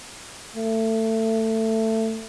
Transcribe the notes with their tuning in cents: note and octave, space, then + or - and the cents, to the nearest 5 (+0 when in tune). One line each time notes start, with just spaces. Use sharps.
A3 +20